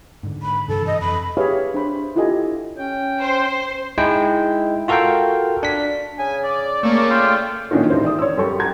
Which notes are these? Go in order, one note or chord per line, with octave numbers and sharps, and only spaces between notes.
G#2 D3
B5
G2 C3 E3 A4
D#5
F2 B5
G4 G#4 B4 C#5 E5 F5
D4 C5 B5
E4 F4 G4 A4 D#5 G#5
C#4 G5
C5
G#3 D#4 E4 G5
F4 F#4 A4 A#4 F5 G5
D4 B6
C#3 G#5
D5
C#3 A3 A#3 C#6
A3 F4 F5 G5
A#2 D#3 C#4 D4 F4 F#4
D#2 G#2 E3 C5
D5 D#6
C#5 E6
F#2 G3 G4 A4 C#6
F#5 G5 A5 A#5 G#6